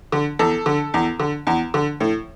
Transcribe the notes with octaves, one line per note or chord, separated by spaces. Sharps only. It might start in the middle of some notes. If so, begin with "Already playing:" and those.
D3
E2 A4
D3
E2
D3
E2
D3
A2